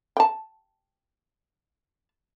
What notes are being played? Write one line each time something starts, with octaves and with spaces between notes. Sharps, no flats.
G5 A5